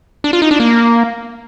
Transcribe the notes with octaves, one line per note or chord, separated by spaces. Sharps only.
D4
F4
D#4
D4
A#3